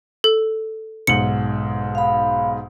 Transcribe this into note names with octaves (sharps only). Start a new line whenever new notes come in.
A4
B1 G#2 C#7 F#7
F5 B5